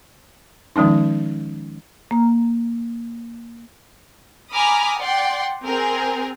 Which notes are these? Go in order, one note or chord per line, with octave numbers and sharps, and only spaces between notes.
D#3 F3 G#3 C#4 D#4
A#3 A#5
G#5 A#5 B5 D6 D#6 F6
D5 F#5 G5 C6
C4 G#4 A#4